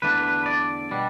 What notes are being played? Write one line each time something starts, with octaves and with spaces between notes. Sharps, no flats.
E2 D3 A3 D4 B4
B4
D5
B2 G3 D4